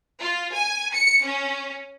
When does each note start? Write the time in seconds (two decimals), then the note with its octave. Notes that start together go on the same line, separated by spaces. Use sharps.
0.20 F4
0.52 G#5
0.93 C#7
1.23 C#4